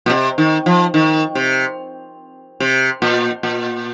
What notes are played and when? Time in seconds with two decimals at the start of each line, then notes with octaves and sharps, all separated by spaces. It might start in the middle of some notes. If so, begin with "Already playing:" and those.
0.06 A#2
0.10 C3
0.38 D#3
0.66 F3
0.94 D#3
1.35 C3
2.60 C3
3.02 A#2
3.43 A#2